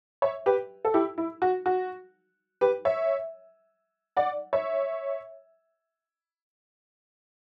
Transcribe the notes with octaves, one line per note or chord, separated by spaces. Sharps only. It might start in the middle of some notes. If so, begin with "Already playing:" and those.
C#5 E5
G4 B4
A4
E4 G4
E4
F#4
F#4
G4 B4
C#5 E5
D5 F#5
C#5 E5